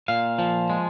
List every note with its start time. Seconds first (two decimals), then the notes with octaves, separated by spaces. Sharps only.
0.08 A#2 F5
0.38 F3
0.70 G#3